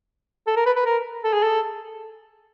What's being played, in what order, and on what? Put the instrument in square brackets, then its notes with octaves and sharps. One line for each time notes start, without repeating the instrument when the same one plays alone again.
[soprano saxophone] A4
A#4
B4
B4
A#4
A4
G#4
A4